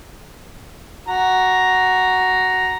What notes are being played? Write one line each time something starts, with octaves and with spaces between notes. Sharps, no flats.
F#4 A#5